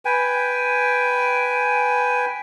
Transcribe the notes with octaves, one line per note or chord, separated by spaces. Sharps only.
B4 G5 G#5